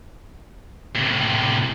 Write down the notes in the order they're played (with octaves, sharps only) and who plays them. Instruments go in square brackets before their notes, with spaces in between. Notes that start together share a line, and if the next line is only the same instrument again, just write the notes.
[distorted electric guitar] A2 C3